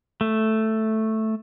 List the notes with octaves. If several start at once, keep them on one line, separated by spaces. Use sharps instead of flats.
A3